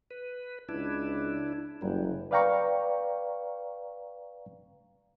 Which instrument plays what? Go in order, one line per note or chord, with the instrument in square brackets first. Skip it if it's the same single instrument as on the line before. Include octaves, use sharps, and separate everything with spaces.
[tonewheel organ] B4
[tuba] C#2 [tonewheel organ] D4 E4
[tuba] F#1 [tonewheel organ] F#3 G3
[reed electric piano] B4 D5 F5 G5 A#5 C#6